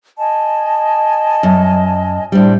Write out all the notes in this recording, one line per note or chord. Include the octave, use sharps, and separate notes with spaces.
D#5 G#5 A5
F#2
A2 G3 D4 C5